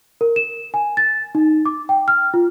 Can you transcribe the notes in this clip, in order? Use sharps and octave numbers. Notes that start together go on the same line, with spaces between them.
A#4
E7
G#5
A6
D#4
D6
G5
F6
F4